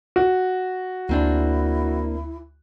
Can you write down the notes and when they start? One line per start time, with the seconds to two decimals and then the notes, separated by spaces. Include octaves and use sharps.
0.16 F#4
1.09 D2 A#3 C4 D4 E4